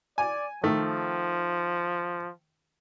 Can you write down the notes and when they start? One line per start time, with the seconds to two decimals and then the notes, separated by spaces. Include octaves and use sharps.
0.18 D5 G#5
0.64 D#3 F3 A3